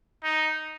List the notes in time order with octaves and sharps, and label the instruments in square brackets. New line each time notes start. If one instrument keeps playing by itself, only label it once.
[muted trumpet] D#4